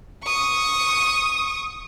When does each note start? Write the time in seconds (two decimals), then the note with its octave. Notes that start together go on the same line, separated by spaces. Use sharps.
0.24 C#6 D#6